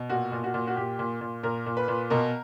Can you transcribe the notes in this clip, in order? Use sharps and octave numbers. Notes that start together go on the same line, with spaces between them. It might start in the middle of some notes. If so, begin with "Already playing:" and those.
Already playing: B2
A#2 F#4
A#2
F#4
A#2
F#4
A#2 G4
A#2
A#2
A#2 A#4
A#2
B4
A#2
B2 A#4